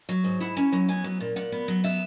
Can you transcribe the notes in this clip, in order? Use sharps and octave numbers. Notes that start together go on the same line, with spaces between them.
F#3
G#2
E4 F#5
C#4 A#5
F#3 A#5
B3 G#5
F#3
A#2
A#2 F#5
B3
F#3
B3 E5